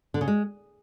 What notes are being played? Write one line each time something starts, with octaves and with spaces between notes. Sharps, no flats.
D3
C#3
G#3